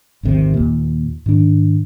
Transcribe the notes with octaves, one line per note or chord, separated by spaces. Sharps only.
G#1 D#2 C3 D#3
D#2 A#2
G#2 D#3 D4